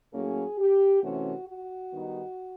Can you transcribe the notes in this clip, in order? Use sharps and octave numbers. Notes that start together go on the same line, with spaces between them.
A2 F#3 A#3 C#4 G#4
G4
C3 E3 A3 C#4 F#4
F#4
D#3 G3 B3 D#4